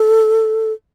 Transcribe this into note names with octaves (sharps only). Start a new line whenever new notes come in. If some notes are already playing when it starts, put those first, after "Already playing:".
Already playing: A4